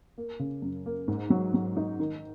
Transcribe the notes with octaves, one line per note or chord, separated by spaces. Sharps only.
A#3
C#3
F#2
A#3
G#2
F#3
F#3
D#4
D#3